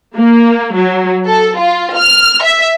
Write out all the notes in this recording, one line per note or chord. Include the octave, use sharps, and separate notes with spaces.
A#3
F#3
A4
F4
F6
E5